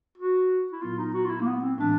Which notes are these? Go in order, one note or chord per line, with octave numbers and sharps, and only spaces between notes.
F#4
E4
A#2 F#3 B3 F4
D#4
F#4
F4
E4
A#3
B3
C4
A2 E3 G#3 D4